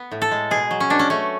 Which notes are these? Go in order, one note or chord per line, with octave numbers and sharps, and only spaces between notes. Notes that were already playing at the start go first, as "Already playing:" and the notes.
Already playing: B3
A2
A4
G#3
B2 G#4
F#3
C#4
B2 D4
C#4
A3 C#4